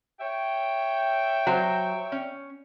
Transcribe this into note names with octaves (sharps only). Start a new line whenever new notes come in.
C#5 E5 G5
F#3 C5
C#4